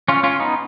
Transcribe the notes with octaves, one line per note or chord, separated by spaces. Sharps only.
C#4 F4
C#4 F4
B3 D#4